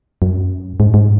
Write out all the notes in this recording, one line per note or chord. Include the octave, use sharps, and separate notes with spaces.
F#2
G#2
G#2